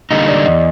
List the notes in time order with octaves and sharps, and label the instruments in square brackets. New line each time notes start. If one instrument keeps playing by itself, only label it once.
[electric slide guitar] D3 G3 A#3 D#4 [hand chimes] D#5
[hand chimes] D5
[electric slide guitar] E2 [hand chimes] D#5